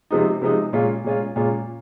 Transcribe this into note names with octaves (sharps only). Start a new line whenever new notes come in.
C3 F3 G#3 D#4
C3 F3 G#3 D#4
A#2 G#3 C#4 F4
A#2 G#3 C#4 F4
A#2 G#3 C#4 F4